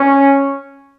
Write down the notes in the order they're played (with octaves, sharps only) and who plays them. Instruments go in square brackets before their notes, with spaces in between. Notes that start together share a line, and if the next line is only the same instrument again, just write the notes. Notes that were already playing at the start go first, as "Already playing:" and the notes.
Already playing: [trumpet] C#4